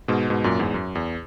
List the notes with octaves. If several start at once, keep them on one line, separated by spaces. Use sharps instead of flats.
G#2 B2
G#2 B2
F#2 A#2
E2 G#2
F#2
E2